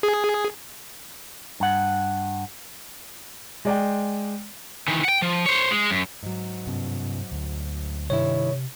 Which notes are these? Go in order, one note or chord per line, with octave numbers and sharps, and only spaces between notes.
G#4
G2 F#5
G#3 D5 G5
D#3 E3
F#5 G5
F3
C5 C#5
G#3
F#2
G#2 F#3
G2 C3 C4
D2
G2 C3 D#3 E4 C#5